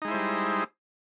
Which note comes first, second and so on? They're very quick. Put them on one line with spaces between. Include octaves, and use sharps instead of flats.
D#4 G#3 E4 C5 G3